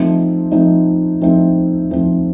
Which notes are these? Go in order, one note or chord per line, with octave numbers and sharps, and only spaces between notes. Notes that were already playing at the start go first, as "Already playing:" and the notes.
Already playing: F3 A3 C4 D#4
F3 A3 C4 D#4
F3 A3 C4 D#4
F3 A3 C4 D#4